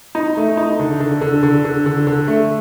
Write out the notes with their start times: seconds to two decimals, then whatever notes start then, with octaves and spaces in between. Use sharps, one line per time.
0.15 D#4
0.37 A3
0.57 D#4
0.79 D3
1.00 D3
1.21 D3
1.43 D3
1.65 D3
1.86 D3
2.07 D3
2.28 A3